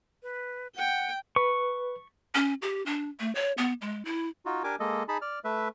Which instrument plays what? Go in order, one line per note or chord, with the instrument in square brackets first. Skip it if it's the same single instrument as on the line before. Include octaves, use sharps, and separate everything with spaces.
[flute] B4
[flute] F#5 [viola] G5
[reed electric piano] B4 [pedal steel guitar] C#6
[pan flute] C#4
G4
D4
A3
C#5
B3
G#3
E4
[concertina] D#4 F4 F#4
D4 G4 A#4 G#5 D6
G#3 A#3 A4 D#5
D#4 G#4 A5 B5
D5 F6
A3 B4 E5